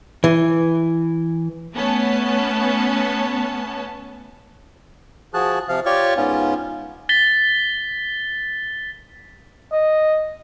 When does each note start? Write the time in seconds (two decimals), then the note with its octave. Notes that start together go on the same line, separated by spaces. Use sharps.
0.24 E3
1.73 A3 B3 C#4 A5
5.34 F3 F#4 G#4 A5 F#6
5.69 C3 F3 F5
5.86 F4 G4 C#5 D5 C#6
6.17 G#2 B3 C#4 F4
7.09 A6 B6 G7
9.72 D#5